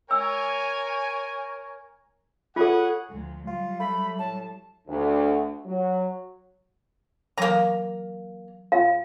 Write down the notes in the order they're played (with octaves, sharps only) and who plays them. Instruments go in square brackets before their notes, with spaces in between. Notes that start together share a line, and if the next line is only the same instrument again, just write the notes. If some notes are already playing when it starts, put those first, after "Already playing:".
[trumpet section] A#4 C#5 G#5 [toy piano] E6
[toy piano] F4 A4 [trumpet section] G#4 C#5 F#5
[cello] D2 F3
[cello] F#3 G3 [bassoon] F4
[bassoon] A3 [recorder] B5
[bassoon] A2 [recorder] A5
[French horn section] D2
F#3
[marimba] E3 F#3 [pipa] A#3 A#5
[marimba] F4 [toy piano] F5